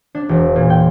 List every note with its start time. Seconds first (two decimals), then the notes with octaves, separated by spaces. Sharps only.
0.15 D4
0.29 E1
0.56 A#2
0.70 G5